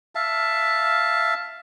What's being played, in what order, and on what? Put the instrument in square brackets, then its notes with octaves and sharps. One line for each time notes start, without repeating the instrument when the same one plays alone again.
[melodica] E5 F5 A5